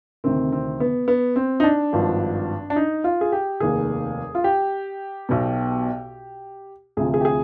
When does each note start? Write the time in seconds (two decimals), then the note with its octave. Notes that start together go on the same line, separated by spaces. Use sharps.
0.24 D2 C3 D#3 C4
0.52 C4
0.80 B3
1.08 B3
1.36 C4
1.60 D#4
1.64 D4
1.93 G#1 G2 F3
2.70 D4
2.76 D#4
3.04 F4
3.21 G#4
3.32 G4
3.60 F1 D#2 D#3 G#4
4.35 F4
4.44 G4
5.29 B1 B2
6.97 D2 C3 F3 G#4
7.14 G#4
7.21 G4
7.25 G#4